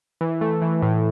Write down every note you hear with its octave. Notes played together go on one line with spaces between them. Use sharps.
E3
A3
E3
A2